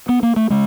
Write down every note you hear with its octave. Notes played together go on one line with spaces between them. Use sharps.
B3
A#3
A3
C#3 G#3